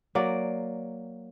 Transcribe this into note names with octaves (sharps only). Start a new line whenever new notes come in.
F#3 A#3 D5